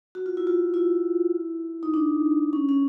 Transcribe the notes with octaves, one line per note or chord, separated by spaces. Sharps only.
F#4
F4
E4
F4
E4
D#4
D4
C#4
C#4